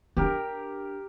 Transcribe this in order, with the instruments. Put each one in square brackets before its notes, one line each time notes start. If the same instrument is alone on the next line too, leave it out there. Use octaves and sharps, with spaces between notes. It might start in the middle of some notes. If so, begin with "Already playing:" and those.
[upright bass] D4 [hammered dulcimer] G4 A#4